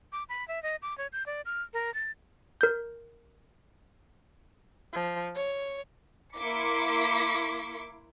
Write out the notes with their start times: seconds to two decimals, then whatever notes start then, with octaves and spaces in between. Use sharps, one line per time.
0.12 D6
0.29 B5
0.48 E5
0.63 D#5
0.82 D6
0.98 C#5
1.13 G6
1.26 D5
1.45 F6
1.74 A#4
1.94 A6
2.61 A#4 G6
4.93 F3
5.35 C#5
6.36 A#3 E4 C6 D6 B6 C#7